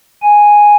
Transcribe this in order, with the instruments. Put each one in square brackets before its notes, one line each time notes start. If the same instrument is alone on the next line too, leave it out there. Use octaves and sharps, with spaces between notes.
[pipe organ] G#5